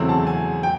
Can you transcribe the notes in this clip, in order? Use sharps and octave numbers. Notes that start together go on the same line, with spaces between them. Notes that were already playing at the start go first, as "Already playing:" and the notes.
Already playing: E2 C#3 F#3 A3 C4
A5
G#5
G5